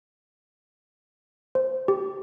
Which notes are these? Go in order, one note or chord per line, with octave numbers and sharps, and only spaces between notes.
C5
G4